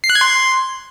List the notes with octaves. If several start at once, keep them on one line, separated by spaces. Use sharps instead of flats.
C7
F#6
G#6
C6